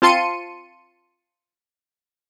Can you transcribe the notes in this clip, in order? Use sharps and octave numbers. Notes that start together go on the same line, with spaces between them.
C4 F4 A5 C6 C#7 D#7